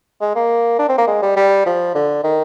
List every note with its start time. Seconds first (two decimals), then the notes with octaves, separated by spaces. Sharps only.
0.21 G#3
0.35 A#3
0.79 D4
0.89 C4
0.98 A#3
1.08 G#3
1.22 G3
1.36 G3
1.66 F3
1.95 D3
2.24 D#3